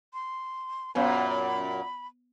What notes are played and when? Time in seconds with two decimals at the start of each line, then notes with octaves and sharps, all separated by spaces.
0.13 C6
0.95 F#2 A#2 B3 C5 F5 B5